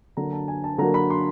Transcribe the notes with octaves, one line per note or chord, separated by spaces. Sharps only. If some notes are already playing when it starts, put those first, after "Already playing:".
D3 F#3 A#3 A#5
A5
G#5
A5
D3 F#3 A#3 A#5
B5
C6